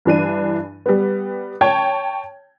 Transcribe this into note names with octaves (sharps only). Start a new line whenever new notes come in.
G2 E3 D4 D#7
G3 B3
C#5 G5 A5 G#6